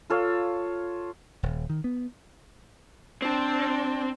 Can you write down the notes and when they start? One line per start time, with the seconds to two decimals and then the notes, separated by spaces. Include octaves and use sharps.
0.10 F4 A4 C#5 F5
1.43 D#1
1.70 D#3
1.84 B3
3.22 C4 D4